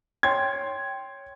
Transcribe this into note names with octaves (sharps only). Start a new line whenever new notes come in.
C#5 G5 C6 G#6